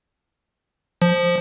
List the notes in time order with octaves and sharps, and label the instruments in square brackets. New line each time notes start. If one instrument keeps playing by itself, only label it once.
[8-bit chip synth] F3